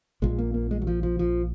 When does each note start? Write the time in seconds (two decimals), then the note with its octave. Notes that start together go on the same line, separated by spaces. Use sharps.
0.22 A#1 A#2 G#3
0.38 A#3
0.54 A#3
0.71 G#3
0.82 F#3
0.87 F3
1.03 F3
1.19 F3